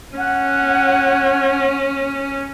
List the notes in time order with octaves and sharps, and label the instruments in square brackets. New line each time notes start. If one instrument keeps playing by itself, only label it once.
[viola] C#4 [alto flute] F#5